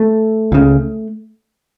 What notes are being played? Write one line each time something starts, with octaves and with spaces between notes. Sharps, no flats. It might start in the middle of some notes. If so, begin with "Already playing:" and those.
Already playing: A3
C#2 C#3